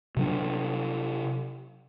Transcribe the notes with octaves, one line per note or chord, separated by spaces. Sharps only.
C3 F#3 D4